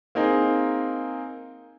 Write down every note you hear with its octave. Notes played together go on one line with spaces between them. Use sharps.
A#3 C4 D#4 G#4